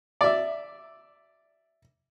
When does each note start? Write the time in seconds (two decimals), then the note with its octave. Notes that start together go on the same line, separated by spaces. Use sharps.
0.21 D5 E5